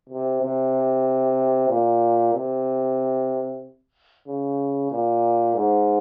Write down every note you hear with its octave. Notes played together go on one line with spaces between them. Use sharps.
C3
C3
A#2
C3
C#3
A#2
G#2